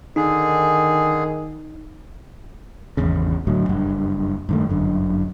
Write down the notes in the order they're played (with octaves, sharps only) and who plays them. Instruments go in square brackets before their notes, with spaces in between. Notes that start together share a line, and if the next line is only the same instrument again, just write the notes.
[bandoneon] D3 G#4 [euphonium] D#3 [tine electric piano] D#4
[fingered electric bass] G#1 E2 C#3
D1 A2 D3 F#3
F#1 G2
G2 D#3 A3
G1 F#2 D3